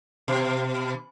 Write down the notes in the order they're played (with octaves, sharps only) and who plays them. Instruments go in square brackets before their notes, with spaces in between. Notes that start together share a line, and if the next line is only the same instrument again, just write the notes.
[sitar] B2